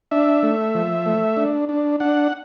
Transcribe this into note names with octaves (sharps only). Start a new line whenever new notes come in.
D4 E5
A3
F3
A3
D4
D4
D4 F#5